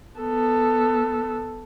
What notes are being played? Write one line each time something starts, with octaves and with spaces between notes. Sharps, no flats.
B3 A4